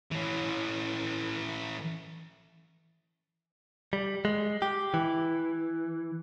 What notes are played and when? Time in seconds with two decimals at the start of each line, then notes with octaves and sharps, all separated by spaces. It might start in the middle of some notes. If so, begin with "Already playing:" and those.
0.11 E3 C#4
3.93 G3
4.25 G#3
4.62 G4
4.94 E3